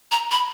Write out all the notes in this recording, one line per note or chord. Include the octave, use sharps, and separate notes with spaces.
A#5
B5